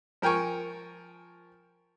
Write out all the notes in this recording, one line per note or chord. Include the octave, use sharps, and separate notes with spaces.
F3 A#4 G5 G#5 C#6